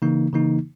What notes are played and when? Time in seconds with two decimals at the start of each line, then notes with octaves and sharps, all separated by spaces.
0.02 C#3 E3 A#3 D#4
0.33 C#3 E3 A#3 D#4